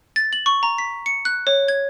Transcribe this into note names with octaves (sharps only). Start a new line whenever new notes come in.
A6
F#7
C#6
A#5
B6
C#7
F#6
C#5
G#6